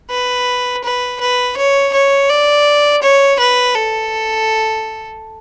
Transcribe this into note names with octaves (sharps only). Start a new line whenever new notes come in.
B4
B4
B4
C#5
C#5
D5
C#5
B4
A4